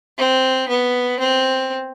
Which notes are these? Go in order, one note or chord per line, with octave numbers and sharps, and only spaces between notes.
C4
B3
C4